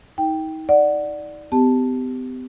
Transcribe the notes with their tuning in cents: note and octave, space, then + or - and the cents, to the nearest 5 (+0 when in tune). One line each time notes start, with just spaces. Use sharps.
D#4 +35 G5 +0
D5 +5 F#5 +0
B3 +45 G4 +0 A5 +0